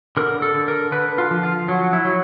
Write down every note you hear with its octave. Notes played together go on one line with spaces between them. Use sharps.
D3 A#4
A4
D3
A#4
D3 B4
F4
F3
F4
F#3
E4
F#3